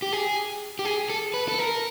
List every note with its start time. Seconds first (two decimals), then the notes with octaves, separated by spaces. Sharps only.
0.02 G4
0.12 G#4
0.79 G4
0.85 G#4
1.10 A4
1.34 B4
1.48 A4
1.58 A#4